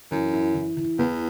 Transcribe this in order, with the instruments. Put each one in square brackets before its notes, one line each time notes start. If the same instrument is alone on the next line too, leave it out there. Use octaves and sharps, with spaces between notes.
[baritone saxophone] F#2 [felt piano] E3
[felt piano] E4
E3
E3
[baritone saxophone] E2 [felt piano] B3